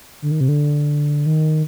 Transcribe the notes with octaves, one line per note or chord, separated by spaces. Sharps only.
D3
D#3
C3
D3
D#3